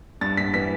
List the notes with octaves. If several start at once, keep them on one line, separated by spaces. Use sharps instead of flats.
G2 A6
B6
E3 B6